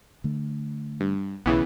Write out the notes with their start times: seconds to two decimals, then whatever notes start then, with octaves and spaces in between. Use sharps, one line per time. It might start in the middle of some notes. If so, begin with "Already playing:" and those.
0.24 D3 A3
1.00 G2
1.46 B1 C#3 E3 B3